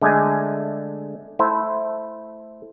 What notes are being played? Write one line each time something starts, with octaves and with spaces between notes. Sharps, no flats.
D3 G#3 A3 G#4 G#5
A3 E4 C5